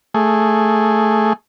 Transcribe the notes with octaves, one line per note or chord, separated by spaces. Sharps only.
A3 G#4